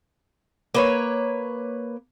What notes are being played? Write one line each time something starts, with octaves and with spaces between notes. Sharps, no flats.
A#3 B4 C#5